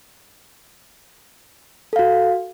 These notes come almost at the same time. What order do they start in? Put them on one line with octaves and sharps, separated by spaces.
A4 F5 F#4